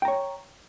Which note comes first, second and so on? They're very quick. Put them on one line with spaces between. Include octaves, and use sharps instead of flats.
G5 A#5 C#5